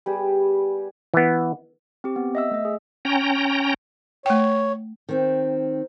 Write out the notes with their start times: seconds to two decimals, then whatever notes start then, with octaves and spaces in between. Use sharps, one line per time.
0.06 G3 B3 G4 G#4
1.14 E3 B3
2.04 C4 G4
2.16 B3
2.35 D#5 E5 E6
2.51 A3 D#5
2.65 G#4
3.05 C#4 G5 A#5
4.26 A3 C#5 G5
5.09 D#3 C4